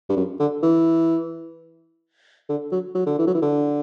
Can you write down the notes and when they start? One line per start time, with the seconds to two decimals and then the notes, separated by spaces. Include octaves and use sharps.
0.09 G2
0.17 F#2
0.40 D3
0.63 E3
2.49 D3
2.72 F#3
2.95 F#3
3.06 D3
3.19 E3
3.27 F#3
3.34 E3
3.42 D3